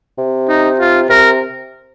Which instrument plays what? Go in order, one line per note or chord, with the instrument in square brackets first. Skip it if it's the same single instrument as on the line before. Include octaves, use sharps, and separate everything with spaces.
[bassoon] C3
[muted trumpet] D#4
F4
[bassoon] C3 [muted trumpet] A#4